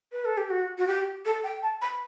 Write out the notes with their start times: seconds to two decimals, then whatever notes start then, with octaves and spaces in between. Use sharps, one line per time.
0.12 B4
0.25 A4
0.37 G4
0.50 F#4
0.78 F#4
0.87 G4
1.25 A4
1.44 G5
1.62 A5
1.82 B5